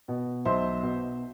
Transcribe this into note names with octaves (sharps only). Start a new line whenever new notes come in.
B2
B1 C5 E5
B2